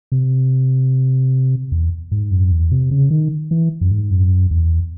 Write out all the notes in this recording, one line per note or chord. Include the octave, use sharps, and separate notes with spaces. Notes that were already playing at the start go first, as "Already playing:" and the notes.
C3
E2
G#2
F#2
E2
C3
C#3
D#3
E3
F#2
G#2
F#2
E2